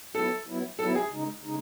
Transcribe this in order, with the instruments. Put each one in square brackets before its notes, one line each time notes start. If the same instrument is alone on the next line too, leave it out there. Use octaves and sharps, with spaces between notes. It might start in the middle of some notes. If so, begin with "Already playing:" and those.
[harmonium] F#3 B3 E4 [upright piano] A4
[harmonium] F#3 B3 E4
[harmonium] F#3 B3 E4 [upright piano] A4
[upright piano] G#4
[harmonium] C#3 G#3 D#4
C#3 G#3 D#4